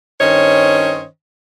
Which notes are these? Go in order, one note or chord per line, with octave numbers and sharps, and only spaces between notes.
G2 D#3 C#4 C5 C#5 D#5